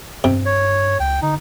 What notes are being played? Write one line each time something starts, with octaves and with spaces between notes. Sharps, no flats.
G2 C3
C#5
C#2 G5
D3 D#4